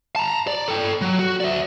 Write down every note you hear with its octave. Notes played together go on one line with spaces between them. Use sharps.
A5 A#5
D5
A4 G5
F#3
F#4
D5 E5